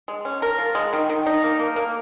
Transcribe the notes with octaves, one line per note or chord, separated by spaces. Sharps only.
G#3
C#4
A#4
F3
G#3
D#3
D#3
D#4
A#3
A#3
A#3